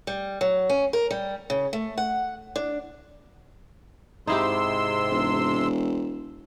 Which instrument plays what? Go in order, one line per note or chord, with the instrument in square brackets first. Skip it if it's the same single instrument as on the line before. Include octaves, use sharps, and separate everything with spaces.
[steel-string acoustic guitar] G3
F#3
C#4
A#4
G3
C#3
A3
F#5
D4
[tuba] G#2 [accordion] C3 C6 E6 [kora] D#4 E4 G4
[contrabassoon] E1